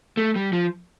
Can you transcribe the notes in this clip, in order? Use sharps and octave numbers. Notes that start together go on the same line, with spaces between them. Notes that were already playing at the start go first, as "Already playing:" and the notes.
A3
G3
F3